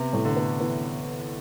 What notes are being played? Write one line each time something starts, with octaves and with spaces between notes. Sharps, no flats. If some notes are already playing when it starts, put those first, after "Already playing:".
Already playing: C3 B3
A2
D3
B3
E3 B3